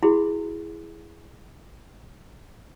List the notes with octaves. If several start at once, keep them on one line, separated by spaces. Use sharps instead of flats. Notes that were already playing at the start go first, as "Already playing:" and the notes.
E4 F#4 G#4 B5